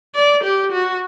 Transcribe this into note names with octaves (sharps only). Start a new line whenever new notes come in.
D5
G4
F#4